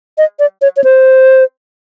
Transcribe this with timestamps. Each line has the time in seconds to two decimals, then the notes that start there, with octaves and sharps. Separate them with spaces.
0.18 D#5
0.39 D5
0.62 C#5
0.77 C#5
0.84 C5